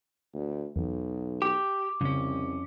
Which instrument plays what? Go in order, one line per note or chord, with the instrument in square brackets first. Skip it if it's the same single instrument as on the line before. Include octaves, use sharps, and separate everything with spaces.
[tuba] D2
[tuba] B1 [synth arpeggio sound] E2
[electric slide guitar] G4 [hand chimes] D6
[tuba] C2 [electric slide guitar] F2 C#4 [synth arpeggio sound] C#3